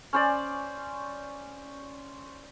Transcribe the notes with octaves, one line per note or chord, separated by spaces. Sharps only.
C#4 C5 D5